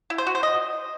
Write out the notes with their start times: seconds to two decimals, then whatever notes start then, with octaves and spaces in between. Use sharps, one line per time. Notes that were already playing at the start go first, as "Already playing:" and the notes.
0.10 E4
0.18 C5
0.27 F#4
0.35 C5
0.43 D#5